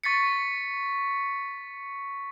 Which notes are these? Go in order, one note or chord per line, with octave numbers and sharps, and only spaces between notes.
C#6 A6 B6 C#7